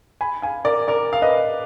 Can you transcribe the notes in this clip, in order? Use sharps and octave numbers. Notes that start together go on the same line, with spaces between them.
G#5 B5
F5 G#5
A#4 D5
A#4 D5
F5
B4 D#5